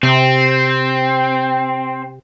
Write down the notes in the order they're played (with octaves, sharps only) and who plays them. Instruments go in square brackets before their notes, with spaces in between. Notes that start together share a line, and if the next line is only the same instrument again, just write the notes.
[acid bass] C3 [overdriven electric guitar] C4